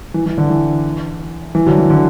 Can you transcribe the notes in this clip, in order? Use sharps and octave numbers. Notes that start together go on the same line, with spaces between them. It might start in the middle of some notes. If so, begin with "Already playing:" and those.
E3
E3
D3
E3
E3
D3 F#3
E3
D3